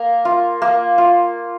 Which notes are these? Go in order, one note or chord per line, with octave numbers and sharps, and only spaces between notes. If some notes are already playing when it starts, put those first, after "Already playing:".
Already playing: A#3 A#4
F4
A#3
F4